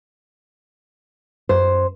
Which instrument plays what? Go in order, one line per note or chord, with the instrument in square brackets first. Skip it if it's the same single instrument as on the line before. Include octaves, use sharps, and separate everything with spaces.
[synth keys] F#2 [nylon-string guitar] C5